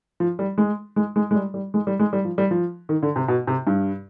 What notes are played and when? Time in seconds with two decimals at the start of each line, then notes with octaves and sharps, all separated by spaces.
0.20 F3
0.39 G3
0.58 G#3
0.96 G#3
1.16 G#3
1.31 G#3
1.35 G3
1.54 G3
1.74 G#3
1.87 G3
2.00 G#3
2.13 G3
2.25 F3
2.38 G3
2.51 F3
2.89 D#3
3.03 D3
3.16 C3
3.28 B2
3.47 C3
3.67 G2